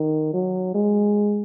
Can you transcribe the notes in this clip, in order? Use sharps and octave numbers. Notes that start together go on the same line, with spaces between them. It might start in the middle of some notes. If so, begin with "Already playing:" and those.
Already playing: D#3
F#3
G#3